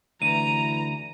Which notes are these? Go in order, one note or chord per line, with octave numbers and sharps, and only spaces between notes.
D2 E3 A#5 D#7